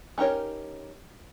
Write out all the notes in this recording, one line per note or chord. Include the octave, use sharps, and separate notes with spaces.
C#4 D#4 G4 A#4 C#5